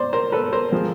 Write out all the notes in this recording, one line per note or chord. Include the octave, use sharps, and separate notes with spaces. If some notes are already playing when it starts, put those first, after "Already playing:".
Already playing: C5 D5
A#4 C5
A4 B4
A#4 C5
F3 G#3 C4